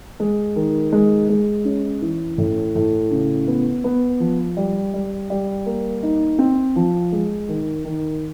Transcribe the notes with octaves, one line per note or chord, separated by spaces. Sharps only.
G#3
D#3
G#3
G#3
C#4
E3
A2
A2
C#3
B3
B3
F3
G3
G3
G3
A#3
D#4
C4
F3
G#3
D#3
D#3